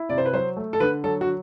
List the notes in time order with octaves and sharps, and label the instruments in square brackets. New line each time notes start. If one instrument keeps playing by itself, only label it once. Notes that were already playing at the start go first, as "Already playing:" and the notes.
Already playing: [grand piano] E4
[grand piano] C3 [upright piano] D5
[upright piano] C5
B4
[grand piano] F#3 [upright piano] C5
[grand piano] A3
[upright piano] A4
[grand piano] D3 [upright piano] B4
[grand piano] F#3 [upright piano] A4
[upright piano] F#4